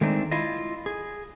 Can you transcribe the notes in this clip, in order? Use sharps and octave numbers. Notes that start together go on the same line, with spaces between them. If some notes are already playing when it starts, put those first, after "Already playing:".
D#3 G#3 A3 C4 D4 D#4
E4 F4 D#5
G#4